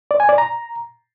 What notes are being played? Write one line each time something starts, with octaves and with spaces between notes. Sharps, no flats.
D5
G#5
D5
A#5